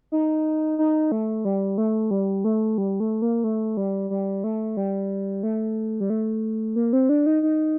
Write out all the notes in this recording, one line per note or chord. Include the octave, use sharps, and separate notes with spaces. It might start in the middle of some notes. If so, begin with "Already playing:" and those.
D#4
D#4
A3
G3
A3
G3
A3
G3
A3
A#3
A3
G3
G3
A3
G3
A3
G3
A3
A#3
C4
D4
D#4
D#4